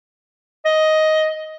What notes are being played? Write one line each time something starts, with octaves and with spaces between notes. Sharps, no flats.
D#5